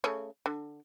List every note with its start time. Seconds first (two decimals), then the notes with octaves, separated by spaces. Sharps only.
0.04 C#3 A3 C#5
0.46 D3